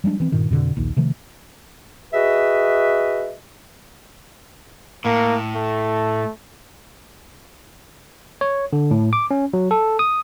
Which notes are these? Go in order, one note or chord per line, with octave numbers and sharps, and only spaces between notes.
F3 G3 G#3 D4
E3 C4
G2 A#2 D#3
F2 B2 D3
A#1 D#2
C3 D#3 F3 A3
F#4 G#4 B4 D#5 E5
A2 A#3
A3
C#5
D3
A2
D6
C#4
F#3
A4
D#6